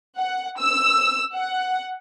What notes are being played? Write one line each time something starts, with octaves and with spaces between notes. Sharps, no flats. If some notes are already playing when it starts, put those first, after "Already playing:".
F#5
E6
F#5